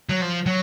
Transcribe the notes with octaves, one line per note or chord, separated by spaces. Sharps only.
F#3
F3
F#3